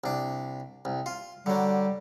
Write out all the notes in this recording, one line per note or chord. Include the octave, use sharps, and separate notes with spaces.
C2 D4
C2
F4
D3 F#3 G3